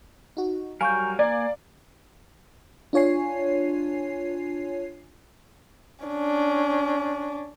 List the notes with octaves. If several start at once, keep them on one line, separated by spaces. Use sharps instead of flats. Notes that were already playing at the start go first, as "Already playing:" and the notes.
D#4 F#4
F#3 G3 A#4 F5 G#5 C#6 G6
A#3 D5 G#5 A#5
D4 F4 C#5 G#5 C7
C#4 D4